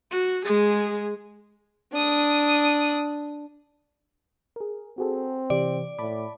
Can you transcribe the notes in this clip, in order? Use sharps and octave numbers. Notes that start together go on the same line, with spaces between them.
F#4
G#3 G#4
D4 D#6
G#4 A#4
C4 F#4 G#4 A4
C3 E3 G4 D5
A2 A5 B5 D6